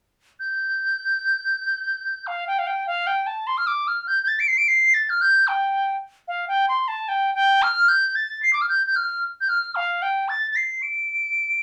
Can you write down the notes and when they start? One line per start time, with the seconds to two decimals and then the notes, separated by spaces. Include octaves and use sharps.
0.40 G6
2.27 F5
2.47 G5
2.59 F5
2.67 G5
2.87 F5
3.07 G5
3.27 A5
3.47 C6
3.57 F6
3.67 D6
3.87 F6
4.08 G6
4.23 G6
4.28 A6
4.40 D7
4.48 C7
4.58 D7
4.68 C7
4.94 A6
5.10 F6
5.21 G6
5.48 G5
6.28 F5
6.48 G5
6.69 C6
6.88 A5
7.08 G5
7.35 G5
7.62 F6
7.88 G6
8.16 A6
8.42 C7
8.53 D6
8.61 F6
8.69 G6
8.87 G6
8.96 F6
9.41 G6
9.49 F6
9.76 F5
10.02 G5
10.29 A6
10.51 A6
10.56 C7
10.83 D7